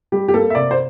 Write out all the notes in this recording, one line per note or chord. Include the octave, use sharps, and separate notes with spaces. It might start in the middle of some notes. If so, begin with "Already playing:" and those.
G3 G4
G4
A#3 A4
E5
C3 D5
C5